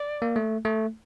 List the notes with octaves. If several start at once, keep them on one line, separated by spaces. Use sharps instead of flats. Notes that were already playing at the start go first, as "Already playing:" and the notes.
Already playing: D5
A#3
A3
A3